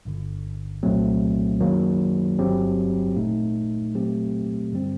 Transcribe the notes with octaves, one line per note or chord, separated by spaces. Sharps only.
G1 G2 D3
C2 A#2 F#3 A3 C4
F#2 D#3 F#3 A#3
G1 G2 F#3 C4 G4
A#2 A3 D#4
A#2 F#3 A3 C4 G4
G2 D3 G3 C4